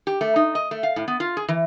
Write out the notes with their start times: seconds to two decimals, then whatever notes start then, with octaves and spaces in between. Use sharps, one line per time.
0.07 G4
0.21 A3
0.36 D#4
0.55 D#5
0.71 A3
0.83 F5
0.96 A2
1.08 B3
1.20 F4
1.37 G#4
1.48 E3